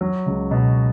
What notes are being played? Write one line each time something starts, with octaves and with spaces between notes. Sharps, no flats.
F#3
C#2
B2